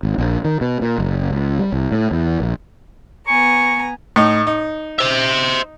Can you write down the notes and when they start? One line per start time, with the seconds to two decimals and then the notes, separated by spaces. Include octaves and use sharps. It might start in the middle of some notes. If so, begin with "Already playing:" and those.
0.03 G#1
0.18 A#1
0.45 D#3
0.61 B2
0.81 A#2
0.98 F#1
1.31 C#2
1.59 G3
1.72 C2
1.92 A2
2.11 E2
2.40 A#1
3.27 B3 G#5 A#5 C#6
4.16 A2 D#4
4.47 D#4
4.99 C5 E5